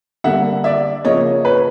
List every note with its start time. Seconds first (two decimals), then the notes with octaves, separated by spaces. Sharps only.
0.24 D3 G3 A#3 E5 F#5
0.64 D5 E5
1.05 C#3 F3 A#3 C#5 D#5
1.45 B4 C#5